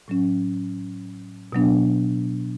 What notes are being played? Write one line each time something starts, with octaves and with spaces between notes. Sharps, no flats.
A2 F#3 C#4
B2 F#3 B3 D4